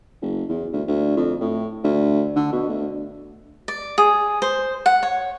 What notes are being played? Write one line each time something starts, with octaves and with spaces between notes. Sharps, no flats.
F#1
E2
D2
D2
F2
A2
D2
D3
B2
D2
D5
G#4
C5
F#5
C#5